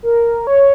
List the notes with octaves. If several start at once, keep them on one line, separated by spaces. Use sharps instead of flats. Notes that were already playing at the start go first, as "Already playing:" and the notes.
A#4
C#5